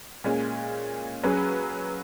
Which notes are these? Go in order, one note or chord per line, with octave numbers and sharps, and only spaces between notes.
A#2 G#3 C#4
F#3 C#4 G#4 B4